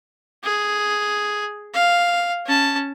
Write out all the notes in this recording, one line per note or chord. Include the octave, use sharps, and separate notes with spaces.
G#4
F5
C#4 A5